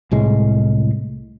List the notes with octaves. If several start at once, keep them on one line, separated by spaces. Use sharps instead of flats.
C2 A2 G#3